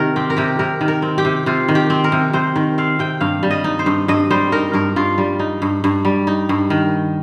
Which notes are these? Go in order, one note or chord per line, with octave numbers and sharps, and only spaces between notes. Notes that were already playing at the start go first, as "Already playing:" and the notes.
Already playing: C3 D#3 A#4
C4 G4
A#4
C3 G4
C3 A#4
D#3
A#4
C4
G4
C3
C3 F4
D#3
G4
C4
A#4
C3
C3 C5
D#3
C4 F5
C3 G5
G2 F5
G3
D#5
D#4
C5
G2
G2 D#5
G3 C5
D#4 A#4
G2 A#4
G2 F4
G3
D#4
G2
G2
G3
D#4
G2
D#3